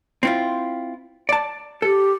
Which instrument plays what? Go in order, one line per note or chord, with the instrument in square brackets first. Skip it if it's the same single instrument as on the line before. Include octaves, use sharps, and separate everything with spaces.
[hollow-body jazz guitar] C4 E4 F4
D5 A5
[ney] G4 [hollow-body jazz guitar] A4